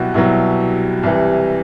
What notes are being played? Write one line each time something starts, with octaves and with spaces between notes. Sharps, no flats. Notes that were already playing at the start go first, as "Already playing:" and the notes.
Already playing: C2 B2 F#3 E4 F#4 G4 B4
C2 B2 F#3 E4
C2 C3 E3